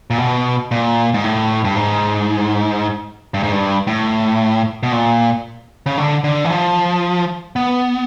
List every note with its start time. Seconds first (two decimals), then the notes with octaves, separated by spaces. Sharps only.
0.10 A#2
0.18 B2
0.71 A#2
1.14 G#2
1.24 A2
1.64 G2
1.76 G#2
3.34 G2
3.43 G#2
3.52 G2
3.87 A2
4.83 B2
4.92 A#2
5.86 C#3
5.98 D3
6.24 D3
6.45 E3
6.50 F3
7.56 B3